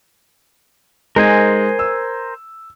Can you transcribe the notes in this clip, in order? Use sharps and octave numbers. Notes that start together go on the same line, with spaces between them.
G#3 D#4 A#4 C5 G#5
E6